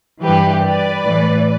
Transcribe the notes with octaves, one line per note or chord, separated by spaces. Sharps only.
G2 E3 G4 B4
B4 D5
A2 E3